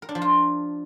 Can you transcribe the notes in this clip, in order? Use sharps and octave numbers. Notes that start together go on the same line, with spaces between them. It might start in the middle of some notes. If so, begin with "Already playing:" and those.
A#4
D4
F3
F4